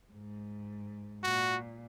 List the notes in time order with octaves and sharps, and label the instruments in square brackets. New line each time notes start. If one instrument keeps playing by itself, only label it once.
[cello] G#2
[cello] A#2 [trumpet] F#4